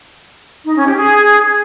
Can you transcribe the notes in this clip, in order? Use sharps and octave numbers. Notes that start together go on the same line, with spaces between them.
D#4
C#4
G4
G#4